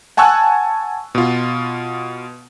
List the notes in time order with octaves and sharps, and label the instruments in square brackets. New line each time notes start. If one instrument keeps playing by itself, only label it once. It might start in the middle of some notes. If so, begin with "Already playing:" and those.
[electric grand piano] F#5 G#5 A5 C#6 E6 F#6
B2 F4